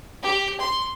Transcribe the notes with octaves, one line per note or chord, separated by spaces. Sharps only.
G4
C6